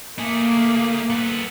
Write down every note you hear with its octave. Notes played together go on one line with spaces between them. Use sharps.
A3 A#3 G#4
B3 A4